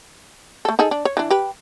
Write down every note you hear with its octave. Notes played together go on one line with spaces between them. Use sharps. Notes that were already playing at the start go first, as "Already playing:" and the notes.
A3 A4
D#4 G#4 A4
D4
C#5
E3 D4
G4 B4